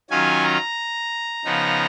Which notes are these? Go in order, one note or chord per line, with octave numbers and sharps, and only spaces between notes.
D#3 F#3 C#4 F4 G#5
A#5
C#3 F3 B3 D#4